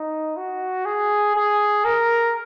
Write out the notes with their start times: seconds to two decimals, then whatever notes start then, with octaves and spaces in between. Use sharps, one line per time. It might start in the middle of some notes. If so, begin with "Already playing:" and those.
Already playing: D#4
0.37 F#4
0.85 G#4
1.36 G#4
1.85 A#4